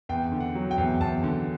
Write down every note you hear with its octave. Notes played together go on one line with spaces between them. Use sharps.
E2 G5
D3
F#5
F#3
G5
E2
E2 A5
D3